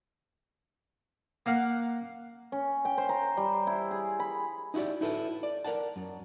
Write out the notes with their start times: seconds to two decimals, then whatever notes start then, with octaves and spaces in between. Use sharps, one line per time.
1.46 A#3 F5 F#5
2.52 C#4
2.85 G5
2.98 C5
3.09 A#5
3.37 G3
3.67 E4
3.91 G#4
4.20 B5
4.74 D#4 E4 F#4 G4 D5
5.01 D#4 E4 A4 B4
5.43 D5
5.65 A#4 D5 F#5 A5
5.96 F#2